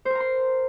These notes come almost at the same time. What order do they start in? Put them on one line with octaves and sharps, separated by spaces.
C5 A#4 A#5 C6